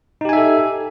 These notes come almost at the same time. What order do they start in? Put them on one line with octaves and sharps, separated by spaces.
D#4 G4 G#5 E5 A4